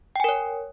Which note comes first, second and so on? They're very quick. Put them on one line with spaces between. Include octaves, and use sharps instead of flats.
G5 G#5 A#4 C#5